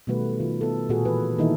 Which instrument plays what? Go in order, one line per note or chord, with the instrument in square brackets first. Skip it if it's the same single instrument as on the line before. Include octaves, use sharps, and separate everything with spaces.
[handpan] B2 D#3 G3 A3 F#4 B4
D#3 F4 B4
B3 A4
A#2 F4 F#4 G#4 A4
E3 E4 B4
D#3 E3 A#3 D#4 E4 A4